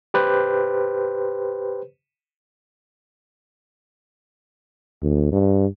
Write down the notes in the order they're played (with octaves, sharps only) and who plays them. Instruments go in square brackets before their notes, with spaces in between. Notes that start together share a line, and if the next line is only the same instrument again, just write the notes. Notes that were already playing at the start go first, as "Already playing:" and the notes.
[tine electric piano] G4 B4 C5
[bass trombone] D2
G2